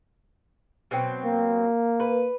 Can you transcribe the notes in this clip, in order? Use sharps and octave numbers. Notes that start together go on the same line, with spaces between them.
B2 F#3 C4
A#3
B4